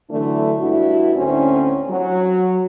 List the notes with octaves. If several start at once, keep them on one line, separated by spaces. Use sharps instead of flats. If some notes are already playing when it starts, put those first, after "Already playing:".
D3 E3 F#3 A3 D4
G2 D4 E4 F#4
D2 A2 C4 C#4
F#3